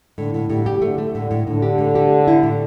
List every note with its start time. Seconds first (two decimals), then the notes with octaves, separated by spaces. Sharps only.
0.18 A2 D3
0.34 A2
0.50 A2 D3 G3
0.66 G4
0.82 D3 A3
0.98 A3
1.14 A2 D3
1.31 A2
1.47 A2 D3
1.62 G4
1.78 A2
1.95 G4
2.11 A3
2.27 E4
2.43 A2